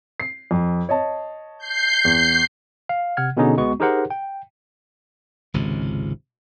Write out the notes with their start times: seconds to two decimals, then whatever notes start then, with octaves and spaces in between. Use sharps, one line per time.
0.20 C7
0.51 F2
0.89 C#5 D#5 A5
1.58 G6 C7
2.05 E2
2.89 F5
3.17 C3 F#5 F6 G#6
3.37 B2 D3 B3 C#4 D#4 G#4
3.57 C#2 G#3 B3 F#4 C#6
3.80 D#4 G4 G#4 A#4 C5 F#5
4.10 G5
5.54 G#1 C#2 C3